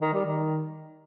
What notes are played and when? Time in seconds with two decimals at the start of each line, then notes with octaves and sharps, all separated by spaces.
0.01 D#3
0.13 G3
0.25 D#3